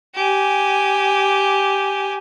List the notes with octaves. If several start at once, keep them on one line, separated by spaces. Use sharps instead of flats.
G4 G#5